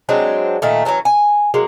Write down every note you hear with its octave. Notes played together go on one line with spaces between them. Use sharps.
F#3 G#3 C4 D4
A#2 D#3 A3
E3 F#3 A#3 C#4
G#5
F#3 G#3 A#3